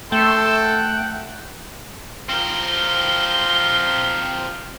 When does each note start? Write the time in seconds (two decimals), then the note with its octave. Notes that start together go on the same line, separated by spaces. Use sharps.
0.12 A3 A4 G5 C6 E6
0.62 F#5
2.29 F3 C4 A#4 G7